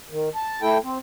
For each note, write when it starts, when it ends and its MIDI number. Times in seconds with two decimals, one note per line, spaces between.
0.10 0.29 51
0.35 0.61 81
0.62 0.78 57
0.62 0.78 64
0.62 0.78 69
0.62 0.78 79
0.83 0.98 60